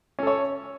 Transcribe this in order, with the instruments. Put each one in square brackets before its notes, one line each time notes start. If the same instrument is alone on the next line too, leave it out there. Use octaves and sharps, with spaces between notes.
[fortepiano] C#4
A4
C#5